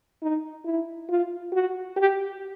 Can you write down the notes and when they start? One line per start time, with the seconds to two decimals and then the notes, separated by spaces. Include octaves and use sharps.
0.22 D#4
0.65 E4
1.09 F4
1.52 F#4
1.96 G4